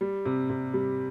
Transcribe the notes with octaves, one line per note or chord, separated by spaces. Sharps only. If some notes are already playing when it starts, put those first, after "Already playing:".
G3
C3
C3
G3